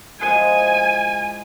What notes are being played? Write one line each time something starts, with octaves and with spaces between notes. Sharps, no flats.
F3 G#3 E4 G#5